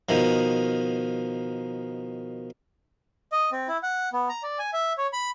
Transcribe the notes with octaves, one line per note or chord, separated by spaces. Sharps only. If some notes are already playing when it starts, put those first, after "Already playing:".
B2 D#3 F3
D#5
C4
E4
F#5
B3
A#5
D5
G#5
E5
C#5
B5